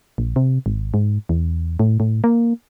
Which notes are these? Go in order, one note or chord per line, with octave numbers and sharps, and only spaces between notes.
A#1
C3
G#1
G#2
E2
A2
A2
A#3